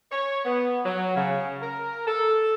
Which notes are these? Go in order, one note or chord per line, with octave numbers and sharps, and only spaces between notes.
C#5
B3
F#3
C#3
A#4
A4